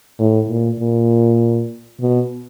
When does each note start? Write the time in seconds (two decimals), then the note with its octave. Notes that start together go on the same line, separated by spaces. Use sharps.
0.19 A2
0.49 A#2
0.79 A#2
2.01 B2